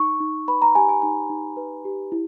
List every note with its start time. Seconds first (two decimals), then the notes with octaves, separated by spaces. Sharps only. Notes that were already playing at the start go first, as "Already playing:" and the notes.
Already playing: D#4 C#6
0.20 D#4
0.48 B4 B5
0.62 A#5
0.75 G4 G#5
0.89 G#5
1.02 D#4 G#5
1.30 D#4
1.57 B4
1.85 G4
2.12 E4